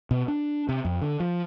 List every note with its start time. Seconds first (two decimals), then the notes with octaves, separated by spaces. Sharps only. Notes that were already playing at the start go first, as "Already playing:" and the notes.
0.11 B2
0.28 D4
0.69 C3
0.85 F2
1.02 D3
1.20 F3